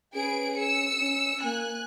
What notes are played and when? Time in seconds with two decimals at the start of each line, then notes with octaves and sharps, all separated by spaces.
0.15 C#4 G#4 B4 D7
0.59 E6 C#7
1.01 C#4
1.45 A#3 G#5 F#6